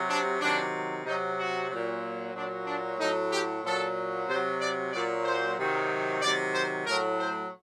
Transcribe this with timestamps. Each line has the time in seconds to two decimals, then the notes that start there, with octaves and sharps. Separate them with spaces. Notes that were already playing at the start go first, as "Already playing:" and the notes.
Already playing: C3 F#3
0.09 D4
0.40 C3 D#3 F#3 D4
1.05 C3 F#3 D#4
1.37 F#4
1.69 A#2 F#3
2.34 A#2 F#3 D4
2.67 D4
2.98 A2 F#3 D#4
3.31 G4
3.63 A#2 F#3 A4
4.28 C3 F#3 C5
4.60 D5
4.92 A#2 F#3 D5
5.25 C5
5.58 C3 D#3 F#3
6.22 C3 D#3 F#3 D5
6.54 C5
6.86 A2 F#3 A#4
7.19 C5